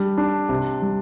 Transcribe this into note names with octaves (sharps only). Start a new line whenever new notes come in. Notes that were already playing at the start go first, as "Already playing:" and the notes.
Already playing: G3 D4
D4
C3
G3